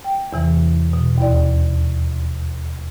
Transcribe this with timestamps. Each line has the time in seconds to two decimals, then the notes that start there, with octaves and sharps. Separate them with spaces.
0.04 G5
0.33 E2 C3 E3
0.93 B2
1.18 D#2 E4 D5